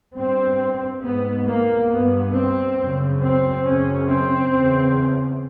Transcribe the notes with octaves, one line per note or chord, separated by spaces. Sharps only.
G2 C4
G#2 B3
A#3
G2 B3
C4
F#2 C#3
C4
F#2 C#3 C#4
C4
E2 C#3